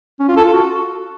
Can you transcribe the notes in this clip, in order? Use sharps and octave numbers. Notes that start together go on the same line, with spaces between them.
C#4
F4
A4
F4
F#4